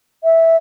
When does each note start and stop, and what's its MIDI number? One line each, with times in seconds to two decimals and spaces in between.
0.24 0.56 76